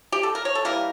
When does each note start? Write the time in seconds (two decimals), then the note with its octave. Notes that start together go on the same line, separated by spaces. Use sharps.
0.12 G4
0.23 A4
0.35 A#4
0.45 C#5
0.55 A4
0.65 E3 G3 A#3 A#4